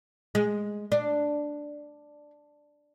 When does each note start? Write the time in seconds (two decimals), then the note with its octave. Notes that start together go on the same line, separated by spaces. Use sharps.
0.35 G#3
0.92 D4